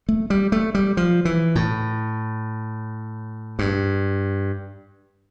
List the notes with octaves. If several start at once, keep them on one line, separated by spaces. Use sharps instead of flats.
A3
G3
A3
G3
F3
E3
A2
G2